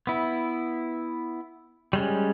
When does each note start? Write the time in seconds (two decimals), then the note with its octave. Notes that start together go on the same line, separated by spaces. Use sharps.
0.07 B3 E4
1.93 G3 G#3 C#4